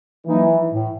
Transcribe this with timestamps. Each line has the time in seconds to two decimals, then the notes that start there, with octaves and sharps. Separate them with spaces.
0.26 E3 F#3 A#3 D#4
0.72 A2